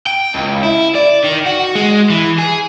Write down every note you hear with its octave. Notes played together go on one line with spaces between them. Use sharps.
G5
C#2
E4
D5
D#3
F#4
G#3
E3
G#4